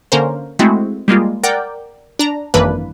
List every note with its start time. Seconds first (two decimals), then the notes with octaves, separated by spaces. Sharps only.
0.12 D3 A#3 C#4 A#4 C5
0.59 G#3 A3 C4 E4 F#4
1.08 G3 G#3 A#3 F4
1.43 A#4 D5 F#5 G5
2.19 D4 A#5
2.54 G#1 F#2 E3 A#3 D4 B4